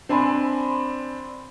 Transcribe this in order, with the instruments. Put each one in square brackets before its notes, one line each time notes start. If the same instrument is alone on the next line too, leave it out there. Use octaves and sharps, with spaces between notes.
[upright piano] C4 D4 G#5 B5 C6